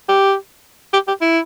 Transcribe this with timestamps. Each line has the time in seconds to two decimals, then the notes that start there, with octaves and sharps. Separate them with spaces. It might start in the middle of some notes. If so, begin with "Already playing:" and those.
0.09 G4
0.93 G4
1.08 G4
1.21 E4